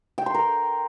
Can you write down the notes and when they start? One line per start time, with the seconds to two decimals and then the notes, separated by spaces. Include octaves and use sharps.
0.18 G5
0.26 C6
0.34 A#4